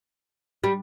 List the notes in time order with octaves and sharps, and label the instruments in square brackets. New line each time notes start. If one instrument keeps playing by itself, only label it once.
[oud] G3